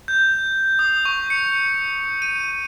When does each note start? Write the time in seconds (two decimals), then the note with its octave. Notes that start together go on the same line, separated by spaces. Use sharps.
0.08 G6
0.79 D#6
1.05 C#6
1.30 C#7
2.22 D#7